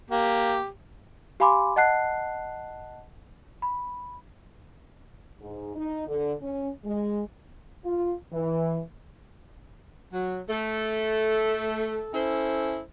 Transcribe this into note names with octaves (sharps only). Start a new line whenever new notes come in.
A#3 G4
G4 F5 G#5 B5 C6 D6
D#5 F#5 A5 F#6 C7
B5
G#2
D#4
D3
C#4
G#3
F4
E3
F#3
A3 A4
C#4 E4 A4 C5